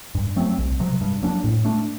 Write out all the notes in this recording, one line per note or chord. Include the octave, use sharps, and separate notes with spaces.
G2
F#3 A3 C4
C2
C3 F#3
G2
F#3 A#3 D4
A2
A3 D4